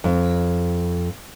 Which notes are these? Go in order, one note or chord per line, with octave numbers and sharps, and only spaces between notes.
F2